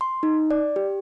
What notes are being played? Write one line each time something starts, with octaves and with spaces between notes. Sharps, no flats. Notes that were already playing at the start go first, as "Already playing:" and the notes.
C6
D#4
D5
G4